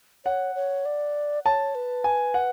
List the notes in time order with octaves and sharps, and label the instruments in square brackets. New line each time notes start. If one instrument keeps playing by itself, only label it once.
[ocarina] C#5 [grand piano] F#5
[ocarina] C#5
D5
[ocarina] C#5 [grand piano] A5
[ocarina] B4
[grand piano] G#5
F#5